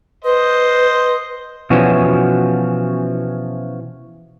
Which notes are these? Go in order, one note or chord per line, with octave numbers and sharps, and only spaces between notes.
B4 C5 D#5
B2 E3 F3 C#4 F#4